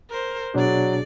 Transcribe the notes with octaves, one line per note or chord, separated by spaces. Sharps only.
A#4 C5
B2 F#3 D4 G#4 D5